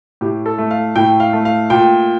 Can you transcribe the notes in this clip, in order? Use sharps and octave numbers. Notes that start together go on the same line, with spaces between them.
A2 G4
A4
A3
F5
A2 G5
F5
A3
F5
A#2 G5